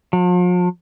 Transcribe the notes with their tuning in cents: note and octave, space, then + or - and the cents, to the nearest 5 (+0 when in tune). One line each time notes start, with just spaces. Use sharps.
F3 +45